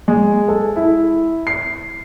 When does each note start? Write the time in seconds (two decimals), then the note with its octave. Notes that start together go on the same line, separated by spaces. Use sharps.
0.08 G#3
0.48 A4
0.76 E4
1.47 C7